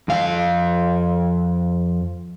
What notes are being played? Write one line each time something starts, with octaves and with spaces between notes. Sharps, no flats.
F2 F5